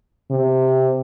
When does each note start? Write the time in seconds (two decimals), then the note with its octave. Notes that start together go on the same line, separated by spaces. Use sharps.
0.31 C3